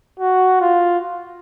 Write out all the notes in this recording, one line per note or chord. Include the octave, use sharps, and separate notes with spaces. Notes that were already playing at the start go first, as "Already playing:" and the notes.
F#4
F4